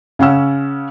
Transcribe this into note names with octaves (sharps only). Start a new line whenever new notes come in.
C#3 C#4 F#5 E6